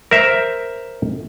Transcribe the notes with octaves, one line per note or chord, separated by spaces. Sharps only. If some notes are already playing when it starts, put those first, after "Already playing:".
A#4 C5 E5